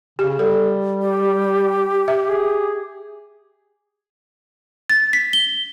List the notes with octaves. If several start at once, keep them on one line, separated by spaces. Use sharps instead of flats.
C#3 G4
G3 A4
G4
E5
G#4
A6
B6
G7